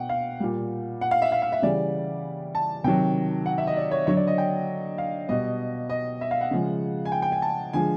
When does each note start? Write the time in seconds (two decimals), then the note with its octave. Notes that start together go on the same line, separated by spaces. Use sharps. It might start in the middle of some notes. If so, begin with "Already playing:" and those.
Already playing: B2 F#5 G5
0.09 F5
0.40 A#2 G3
1.01 F#5
1.11 F5
1.22 E5
1.32 F5
1.42 F5
1.52 E5
1.62 C#3 E3 G3 D5
2.55 A5
2.84 C3 D#3 F#3 G5
3.46 F#5
3.58 E5
3.67 D#5
3.77 D5
3.91 C#5
4.07 D3 F#3 C#5
4.17 D5
4.27 D#5
4.38 G5
4.98 F5
5.29 B2 G3 D#5
5.90 D#5
6.21 E5
6.31 F5
6.41 F#5
6.51 C#3 F3 G#3
7.05 G#5
7.12 G5
7.22 G5
7.32 G#5
7.42 A5
7.73 D3 F3 G#3 G#5